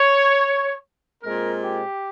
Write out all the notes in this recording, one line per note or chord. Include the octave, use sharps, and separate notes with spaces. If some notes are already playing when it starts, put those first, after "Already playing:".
Already playing: C#5
A#2 G#3 C4 A#4
G4